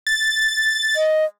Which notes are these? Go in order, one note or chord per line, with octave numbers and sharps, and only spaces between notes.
A6
D#5